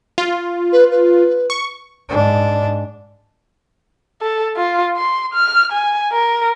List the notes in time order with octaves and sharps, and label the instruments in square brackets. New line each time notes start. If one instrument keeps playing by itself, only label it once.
[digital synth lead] F4
[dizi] B4
B4
[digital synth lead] C#6
[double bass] G#2 D4
[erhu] A4
F4
C6
F6
G#5
A#4